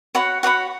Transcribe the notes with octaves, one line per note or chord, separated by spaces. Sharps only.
F#4 C#5 F#5 B5
F#4 C#5 F#5 B5